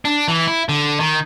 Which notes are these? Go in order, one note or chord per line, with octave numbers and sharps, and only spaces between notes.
D4
E3
E4
D3
D#3